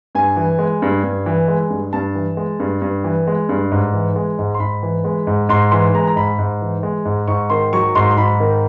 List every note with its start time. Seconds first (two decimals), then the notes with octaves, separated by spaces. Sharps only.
0.15 G2 G#5
0.36 E3
0.59 G#3
0.82 G2
1.03 G2
1.26 E3
1.48 G#3
1.70 G2
1.93 G2 A5
2.15 E3
2.37 G#3
2.60 G2
2.82 G2
3.04 E3
3.27 G#3
3.49 G2
3.72 G#2
3.93 E3
4.16 G#3
4.39 G#2
4.54 C6
4.60 G#2 B5
4.83 E3
5.04 G#3
5.27 G#2
5.49 G#2 C6
5.71 E3 C6
5.94 G#3 A#5
6.07 A#5
6.16 G#2 B5
6.38 G#2
6.61 E3
6.83 G#3
7.05 G#2
7.28 G#2 C#6
7.50 D#3 C6
7.73 F#3 C#6
7.95 G#2 C6
8.11 C6
8.17 G#2 B5
8.40 D#3